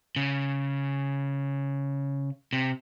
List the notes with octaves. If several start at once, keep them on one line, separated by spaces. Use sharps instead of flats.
C#3
C3